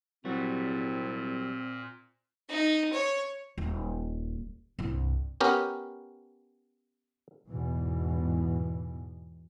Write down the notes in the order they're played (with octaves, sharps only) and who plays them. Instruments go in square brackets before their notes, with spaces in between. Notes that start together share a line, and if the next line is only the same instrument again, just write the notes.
[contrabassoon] C2 [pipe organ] A#2 [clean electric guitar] F#3 G3 F#4 [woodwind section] C4
[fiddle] D#4
C#5
[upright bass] D#1
C2 G2
[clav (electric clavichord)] B3 C#4 G4 A#4
[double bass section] E2 G#2 B2 E3